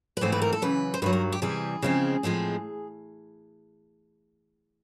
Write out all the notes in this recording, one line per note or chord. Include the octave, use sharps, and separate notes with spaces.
B4
G#2 E3 A3 C4 C5
B4
A#4
A4
F#2 C#3 E3 B4
C5
G2 D#3 F#3 B4
A#4
G4
C3 E3 G3 G#4
C#3 F3 G#3 C4
A2 F3 G#3 C4